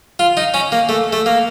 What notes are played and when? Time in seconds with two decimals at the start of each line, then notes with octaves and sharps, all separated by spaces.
0.19 F4
0.37 D#4
0.54 C#4
0.72 A#3
0.89 A3
1.13 A3
1.26 A#3